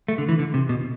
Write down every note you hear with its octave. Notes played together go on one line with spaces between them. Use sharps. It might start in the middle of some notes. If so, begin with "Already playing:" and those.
A3
D3
E3
D3
C3
B2